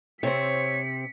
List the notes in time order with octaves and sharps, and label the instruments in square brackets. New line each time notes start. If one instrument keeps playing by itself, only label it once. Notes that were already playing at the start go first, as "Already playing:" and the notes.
[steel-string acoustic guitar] C3 C4 [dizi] C#5 [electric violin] B6 C#7